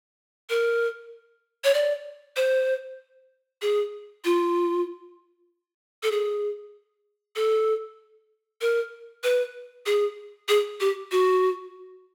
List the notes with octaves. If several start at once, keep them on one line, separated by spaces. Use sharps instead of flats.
A#4
C#5
D5
C5
G#4
F4
A4
G#4
A4
A#4
B4
G#4
G#4
G4
F#4